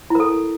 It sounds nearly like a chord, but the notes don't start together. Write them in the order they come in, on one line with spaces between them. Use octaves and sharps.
E4 A#4 A4